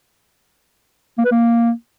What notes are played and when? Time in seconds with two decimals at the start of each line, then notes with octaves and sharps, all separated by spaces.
1.18 A#3
1.25 B4
1.31 A#3